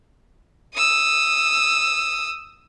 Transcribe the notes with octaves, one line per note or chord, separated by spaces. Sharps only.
D#6 E6